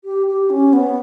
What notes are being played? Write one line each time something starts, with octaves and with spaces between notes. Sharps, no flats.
G4
G4
C#4
B3